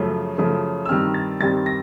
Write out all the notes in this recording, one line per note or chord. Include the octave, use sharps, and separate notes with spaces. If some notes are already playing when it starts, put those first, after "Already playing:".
Already playing: F#2 C#3 F3 A3
F#2 C#3 F3 A3
E6
G2 D#3 G3 C4 F6
A6
G2 D#3 G3 C4 A6
A#6